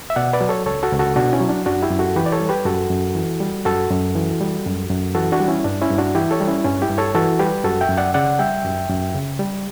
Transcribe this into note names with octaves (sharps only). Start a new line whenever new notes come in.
E5
B2 D5 F#5
B4 D5
F#3
A4 C#5
C#2 A4 C#5
F#4 A4
C#2
F#4 A4
B2 D4 F#4
C#4 E4
F#3
D4
F#2 D4 F#4
E4 G4
F#2
F#4 A4
E3 G4 B4
D5
A4 C#5
G3
G4 B4
F#2 F#4 A4
F#2
E3
G3
F#2 F#4 A4
F#2
E3
G3
F#2
F#2
E3 F#4 A4
D4 F#4
G3
C#4 E4
G2 D4
C#4 E4
G2
D4 F#4
E3 E4 G4
A4 C#5
G3
C#4 E4
G2 C#4
E4 G4
G2
A4 C#5
E3 F#4 A4
G3 G4 B4
F#2 F#4 A4
E5 G5
F#2
D5 F#5
C#3 D5 F#5
G3 E5 G5
F#2
F#2
C#3
G3